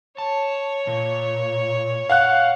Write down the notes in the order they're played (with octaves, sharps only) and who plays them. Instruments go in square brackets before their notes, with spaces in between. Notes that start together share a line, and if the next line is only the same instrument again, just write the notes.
[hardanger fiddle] C#5 [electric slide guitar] A5
[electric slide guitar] A#2
[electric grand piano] F5 F#5 F#6